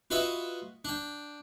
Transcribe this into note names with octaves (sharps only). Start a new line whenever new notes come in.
F4 F#4 B4 C#5 D#5 E5
D4 G5